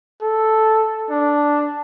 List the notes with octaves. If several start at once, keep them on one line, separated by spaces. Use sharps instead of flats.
A4
D4